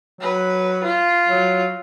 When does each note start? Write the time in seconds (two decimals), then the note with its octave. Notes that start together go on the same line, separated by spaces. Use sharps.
0.21 F#3 B4
0.84 F4
1.28 F#3